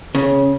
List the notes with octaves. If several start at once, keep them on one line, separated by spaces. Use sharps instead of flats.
C#3